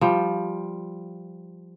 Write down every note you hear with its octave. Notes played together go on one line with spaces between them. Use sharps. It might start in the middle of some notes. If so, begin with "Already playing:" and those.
F3 G3